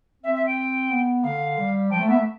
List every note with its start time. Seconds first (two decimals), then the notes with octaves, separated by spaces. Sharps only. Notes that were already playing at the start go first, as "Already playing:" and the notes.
0.23 C4 E5
0.35 E5
0.46 G5
0.90 B3
1.24 D3 F5
1.57 G3
1.90 F3 G5
1.99 A3
2.08 B3 E5
2.16 A3